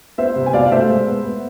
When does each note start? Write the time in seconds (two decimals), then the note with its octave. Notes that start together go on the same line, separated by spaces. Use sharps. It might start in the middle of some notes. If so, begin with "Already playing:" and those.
0.18 B3 C5 E5
0.36 C3
0.46 G#5
0.53 B2 D5 F5
0.71 A3 C5 E5
0.89 G#3
1.07 B3
1.25 B3